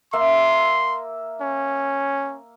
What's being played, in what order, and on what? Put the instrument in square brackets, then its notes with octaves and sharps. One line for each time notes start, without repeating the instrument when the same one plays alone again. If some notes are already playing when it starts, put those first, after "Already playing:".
[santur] A#3 E5 [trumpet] C6
[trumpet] C#4